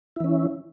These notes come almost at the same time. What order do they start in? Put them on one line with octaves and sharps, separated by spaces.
E4 E3 C#4